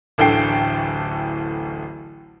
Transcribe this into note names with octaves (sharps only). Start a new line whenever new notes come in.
D1 A1 D3 A4 G5 C7